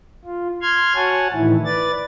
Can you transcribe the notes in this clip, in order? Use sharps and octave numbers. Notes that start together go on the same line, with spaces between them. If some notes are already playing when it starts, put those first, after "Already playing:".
F4
C6 F6 G#6
F#4 C#5 F#5 G#5 A5
A2 D#3 E3 E4
B4 D5 A6